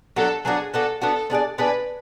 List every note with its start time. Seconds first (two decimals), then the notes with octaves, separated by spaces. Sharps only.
0.16 F#3 B3 D4 F#4 A4
0.45 F#3 B3 D4 F#4 G#4
0.73 B3 D4 F#4 A4
1.01 B3 D4 F#4 A4
1.30 B3 D4 G#4 D5
1.58 B3 D4 G#4 B4 D5